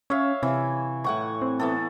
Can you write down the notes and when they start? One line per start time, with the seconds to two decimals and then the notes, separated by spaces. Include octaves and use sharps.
0.10 C#4 C#5 E5 F5
0.43 C3 E3
1.04 A2 F#5 C#6
1.42 C4
1.60 E3 B3 A4